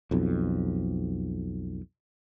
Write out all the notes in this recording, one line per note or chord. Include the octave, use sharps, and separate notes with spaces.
B1 F2